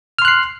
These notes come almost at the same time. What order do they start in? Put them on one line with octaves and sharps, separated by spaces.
F6 C6 F#6 C7